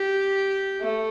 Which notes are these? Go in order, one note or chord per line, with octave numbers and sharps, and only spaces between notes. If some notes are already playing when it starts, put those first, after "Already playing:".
Already playing: G4
A3